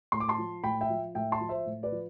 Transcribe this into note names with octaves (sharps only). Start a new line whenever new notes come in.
A2 C6
D6
A5 C6
F3
A2 G5 B5
E5 G5
F3
A2 E5 G5
A5 C6
F3
C5 E5
A2
B4 D5
F3